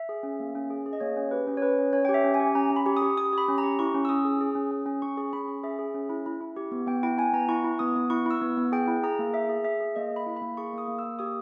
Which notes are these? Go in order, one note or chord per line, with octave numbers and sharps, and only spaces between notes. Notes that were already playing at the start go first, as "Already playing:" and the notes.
Already playing: E5
G#4
C#4
A#3
C#4
G#4
G#4
D#5
A#3 C#5
C#4
G4 B4
C#4
C#5
C#4 B4
C#4
C#4 C#5
G5
G4
E5
C#4
G#5
G4
C#4 A#5
C#4
B5
G4
D#6
G4
G4 D#6
G4 B5
C#4
A#5
G4
E4 C#6
C#4
E6
C#4 D#6
G#4
G#4
C#4
C#4
C#4
C#4 C#6
G#4 C#6
C#4 B5
C#4
G#4 E5
G#4
C#4
E4
E4
E4
G4
B3
B3 G5
E4 G5
E4 G#5
B3 A#5
E4 C#6
E4
B3 D#6
B3
E4 C#6
E4 E6
B3
B3
G#4 G5
E4
G#4 A#5
A#3
G#4 E5
G#4
G#4 E5
G#4
A#3 D#5
A#3
B5
E4
B5
A#3
G#4 C#6
A#3 D#6
A#3
A#3 E6
G4 D#6